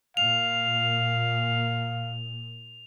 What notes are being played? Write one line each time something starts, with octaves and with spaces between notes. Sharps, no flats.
A#2 F5 F7